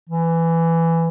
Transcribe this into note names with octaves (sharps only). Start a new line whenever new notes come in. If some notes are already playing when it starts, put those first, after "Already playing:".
E3